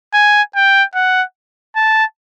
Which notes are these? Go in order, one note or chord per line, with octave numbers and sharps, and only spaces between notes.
G#5
G5
F#5
A5